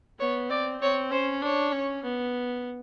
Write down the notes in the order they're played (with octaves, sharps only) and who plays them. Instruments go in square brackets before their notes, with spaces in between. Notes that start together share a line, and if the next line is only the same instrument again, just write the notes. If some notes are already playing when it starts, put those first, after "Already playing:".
[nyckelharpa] B3 [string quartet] C#5
[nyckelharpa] C4 [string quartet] D5
[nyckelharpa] C4 [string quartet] C#5
[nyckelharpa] C#4 [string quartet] C5
[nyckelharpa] D4 [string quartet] C#5
[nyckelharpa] C#4
B3